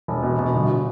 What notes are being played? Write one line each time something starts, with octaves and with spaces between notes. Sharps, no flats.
E1
B2
B2
G1